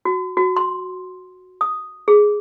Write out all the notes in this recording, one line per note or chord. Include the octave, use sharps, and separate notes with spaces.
F#4
F#4
C6
D#6
G#4